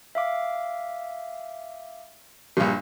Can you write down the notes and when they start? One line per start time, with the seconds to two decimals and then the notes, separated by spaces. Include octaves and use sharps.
0.15 E5 F5 D6
2.57 A#1 G2